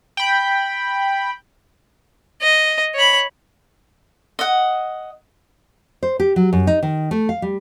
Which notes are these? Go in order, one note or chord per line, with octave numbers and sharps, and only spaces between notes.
G5 B5
D#5
C#5 B5
D#5 F#5
C5
G4
F#3
F#2
D#4
D#3
A3
F5
G3